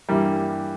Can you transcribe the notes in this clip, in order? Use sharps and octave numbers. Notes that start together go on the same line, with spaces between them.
G2 E3 G3 A#3